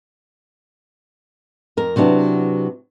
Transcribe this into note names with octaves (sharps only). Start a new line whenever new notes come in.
F2 A#4
C3 F#3 B3 D4 E4